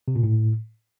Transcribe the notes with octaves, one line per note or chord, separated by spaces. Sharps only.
C3
A#2
A2